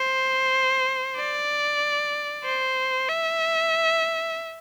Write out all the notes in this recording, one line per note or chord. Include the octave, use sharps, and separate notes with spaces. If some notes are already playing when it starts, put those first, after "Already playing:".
Already playing: C5
D5
C5
E5